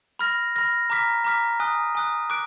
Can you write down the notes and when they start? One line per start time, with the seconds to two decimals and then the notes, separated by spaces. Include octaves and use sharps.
0.19 B5 F6 A#6
0.56 B5 F6 A#6
0.90 A#5 D6 F6 B6
1.25 A#5 D6 F6 B6
1.60 G#5 D#6 F#6
1.95 G#5 D#6 F#6
2.30 D6 F#6 D7